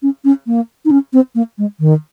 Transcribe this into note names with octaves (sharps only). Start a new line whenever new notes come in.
C#4
C#4
A#3
D#4
C#4
C4
A#3
G#3
D#3